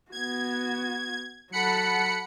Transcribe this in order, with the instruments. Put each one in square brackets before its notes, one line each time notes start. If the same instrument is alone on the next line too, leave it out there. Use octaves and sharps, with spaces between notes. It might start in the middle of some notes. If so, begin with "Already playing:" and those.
[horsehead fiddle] B3 F#4 [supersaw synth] G#6
[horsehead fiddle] F#3 A4 [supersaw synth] F#5 B5 C#7